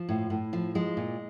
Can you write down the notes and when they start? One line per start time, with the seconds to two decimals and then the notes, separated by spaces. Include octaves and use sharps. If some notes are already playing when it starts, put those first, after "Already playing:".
Already playing: F3
0.09 A2
0.30 A2
0.53 F3
0.75 F3 G#3
0.97 A#2